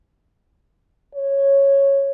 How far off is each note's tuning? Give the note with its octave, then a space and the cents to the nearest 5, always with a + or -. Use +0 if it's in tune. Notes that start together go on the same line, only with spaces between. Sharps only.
C#5 -5